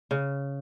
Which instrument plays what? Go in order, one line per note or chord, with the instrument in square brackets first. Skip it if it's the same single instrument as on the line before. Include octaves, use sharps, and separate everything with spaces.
[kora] C#3